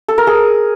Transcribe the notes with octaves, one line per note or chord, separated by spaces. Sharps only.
A4
A#4
G#4